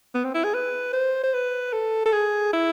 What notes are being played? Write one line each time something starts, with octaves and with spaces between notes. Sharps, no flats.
B3
C4
E4
G#4
B4
C5
C5
B4
A4
A4
G#4
E4